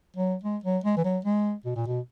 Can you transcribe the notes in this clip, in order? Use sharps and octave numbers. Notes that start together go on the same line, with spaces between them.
F#3
G#3
F#3
G#3
E3
F#3
G#3
B2
A#2
B2